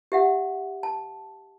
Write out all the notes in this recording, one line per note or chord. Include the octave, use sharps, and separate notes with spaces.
G4 E5 F#5
A5